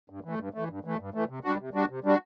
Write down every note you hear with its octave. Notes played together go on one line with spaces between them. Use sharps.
G2
E3 A3
G2
E3 A3
G2
E3 A3
G2
E3 A3
C3
G3 D4 F#4
C3
G3 D4 F#4
C3
G3 D4 F#4